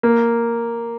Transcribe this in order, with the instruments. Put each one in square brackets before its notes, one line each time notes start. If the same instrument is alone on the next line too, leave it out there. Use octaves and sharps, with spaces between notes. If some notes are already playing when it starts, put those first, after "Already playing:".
[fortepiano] A#3